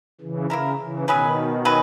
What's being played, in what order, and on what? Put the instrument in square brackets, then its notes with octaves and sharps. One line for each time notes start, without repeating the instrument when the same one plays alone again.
[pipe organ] C#3 E3
[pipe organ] C#3 [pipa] A#3 E4 A#4
[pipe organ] C#3 E3
[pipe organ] B2 D#3 [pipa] F#3 C#4 G#4 B4
[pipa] F#3 C#4 G#4 B4